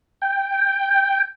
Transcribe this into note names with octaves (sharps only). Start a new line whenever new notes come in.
G5